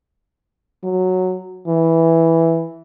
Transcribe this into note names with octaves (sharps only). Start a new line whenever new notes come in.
F#3
E3